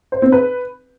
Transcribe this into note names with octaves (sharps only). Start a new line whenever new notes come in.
C5
C4
B4